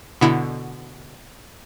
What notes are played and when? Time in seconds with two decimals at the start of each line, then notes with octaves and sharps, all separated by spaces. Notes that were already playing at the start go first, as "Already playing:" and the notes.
0.21 B2 D3 E4